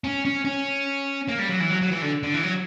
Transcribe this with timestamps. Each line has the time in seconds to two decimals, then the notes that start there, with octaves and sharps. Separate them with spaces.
0.04 C#4
0.25 C#4
0.45 C#4
1.28 A#3
1.39 G3
1.49 F#3
1.60 E3
1.71 F#3
1.82 F#3
1.91 E3
2.02 D3
2.23 D3
2.34 E3
2.43 F#3